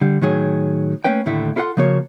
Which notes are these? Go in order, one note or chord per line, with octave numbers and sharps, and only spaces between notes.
D3 G3
A2 D#3 F#3 G#4
A3 A#3 C#4 B4 G5
D#2 A2 D3 A3 E4
E4 F4 A4 C#5 F#5 C6
C#3 F3 A#3 F#4 C#5